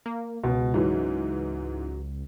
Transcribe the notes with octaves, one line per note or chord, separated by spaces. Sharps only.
A#3
C#2 B2
G#2 E3 F#3